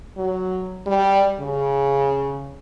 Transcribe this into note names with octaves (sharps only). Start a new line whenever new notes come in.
F#3
G3
C#3